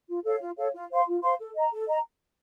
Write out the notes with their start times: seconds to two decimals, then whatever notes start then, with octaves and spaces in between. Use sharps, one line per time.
0.09 F4
0.25 A4 C#5 F5
0.41 F4
0.58 A4 C#5 F5
0.74 F4
0.90 C5 F5 C6
1.07 F4
1.23 C5 F5 C6
1.39 A4
1.55 D#5 A#5
1.72 A4
1.88 D#5 A#5